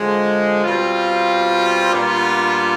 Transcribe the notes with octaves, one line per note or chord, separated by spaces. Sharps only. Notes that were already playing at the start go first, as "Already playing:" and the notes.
Already playing: D3 F3 G#3
B2 G3 C4 F4
A#2 G3 B3 D4 F4